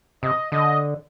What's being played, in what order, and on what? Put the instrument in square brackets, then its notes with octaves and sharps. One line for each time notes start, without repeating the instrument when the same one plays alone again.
[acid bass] C3 [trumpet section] D#5
[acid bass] D3 [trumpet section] D#5